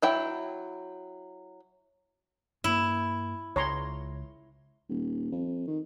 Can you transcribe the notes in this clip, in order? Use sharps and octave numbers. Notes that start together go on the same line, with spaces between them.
F#3 E4 G5
G2 A#3 E4
C#2 C#5 A#5 C6
D#1
F2
D#3